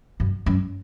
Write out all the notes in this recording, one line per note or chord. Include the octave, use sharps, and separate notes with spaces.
F#2
F#2